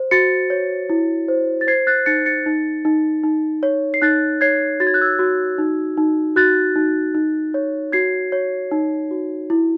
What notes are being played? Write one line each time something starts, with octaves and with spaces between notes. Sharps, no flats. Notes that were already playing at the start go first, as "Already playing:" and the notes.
Already playing: C5
F#4 A6 C#7
C#5
E4
C5
A6
C5 G#6 C7
F#6 A6
D#4 A6 C#7
A6 C#7
D#4
D#4
D#4
C#5
C7
D#4 F#6 A6
C#5 G#6 C7
F#4 A6
G#6
F#6
E6 G#6
F#4
D#4
D#4
F#4 F#6 A6
D#4
D#4
C#5
F#4 G#6 C7
C#5
D#4
F#4
E4